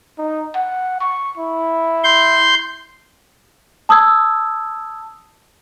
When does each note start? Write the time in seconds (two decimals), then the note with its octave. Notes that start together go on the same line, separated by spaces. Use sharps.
0.18 D#4
0.55 F#5
1.01 C#6
1.37 E4
2.04 C6 G6
3.89 A5 D#6 E6 G#6